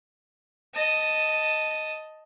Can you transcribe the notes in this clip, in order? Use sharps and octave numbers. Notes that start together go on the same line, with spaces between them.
D#5 A5